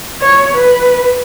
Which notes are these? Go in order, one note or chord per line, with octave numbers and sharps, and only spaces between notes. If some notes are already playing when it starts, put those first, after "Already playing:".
C#5
B4